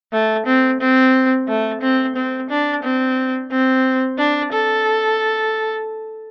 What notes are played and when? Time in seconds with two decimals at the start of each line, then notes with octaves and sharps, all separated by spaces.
0.13 A3
0.47 C4
0.81 C4
1.48 A3
1.82 C4
2.16 C4
2.50 D4
2.84 C4
3.51 C4
4.18 D4
4.52 A4